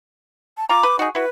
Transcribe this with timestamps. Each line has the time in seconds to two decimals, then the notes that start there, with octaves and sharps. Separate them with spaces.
0.57 A5
0.69 F4 A#5 D6
0.83 B4
0.99 D#4 F#4 G#4
1.15 E4 F#4 B4